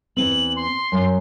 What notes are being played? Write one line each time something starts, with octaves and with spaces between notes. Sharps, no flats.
E2 E3 C4 F#7
C6
F#2